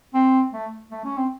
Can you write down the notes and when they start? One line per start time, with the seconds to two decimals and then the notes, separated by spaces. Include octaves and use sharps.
0.14 C4
0.53 A3
0.91 A3
1.04 C#4
1.17 C4